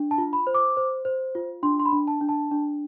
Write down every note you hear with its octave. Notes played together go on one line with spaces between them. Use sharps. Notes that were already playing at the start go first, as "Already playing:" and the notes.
Already playing: D4
A5
F4
B5
C5
D6
C5
C5
F4
D4 C6
C6
B5
D4
A5
D4
A5
D4